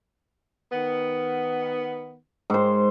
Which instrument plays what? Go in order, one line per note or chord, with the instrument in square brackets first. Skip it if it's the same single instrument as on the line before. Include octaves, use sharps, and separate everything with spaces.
[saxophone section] D#3 B3
[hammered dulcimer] G#2 C5